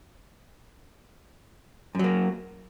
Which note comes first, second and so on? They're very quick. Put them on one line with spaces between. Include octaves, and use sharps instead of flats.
F#2 F#3 A#3